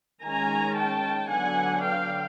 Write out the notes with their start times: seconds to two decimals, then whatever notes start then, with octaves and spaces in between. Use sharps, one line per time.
0.23 D#3 G#3 C#4 G#5 A#5
0.76 G5 A5
1.29 D3 F#3 B3 D4 F#5 G#5
1.83 F5 G5